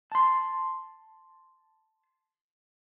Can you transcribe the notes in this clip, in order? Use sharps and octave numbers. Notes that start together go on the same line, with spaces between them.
A5 C6